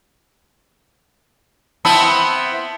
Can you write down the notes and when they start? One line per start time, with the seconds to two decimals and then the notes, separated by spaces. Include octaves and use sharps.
1.85 B3 C4 E4 A5